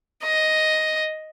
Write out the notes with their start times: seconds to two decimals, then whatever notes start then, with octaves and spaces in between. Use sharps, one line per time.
0.23 D#5